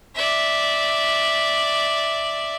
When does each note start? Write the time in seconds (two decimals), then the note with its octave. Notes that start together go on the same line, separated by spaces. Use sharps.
0.15 D5 E5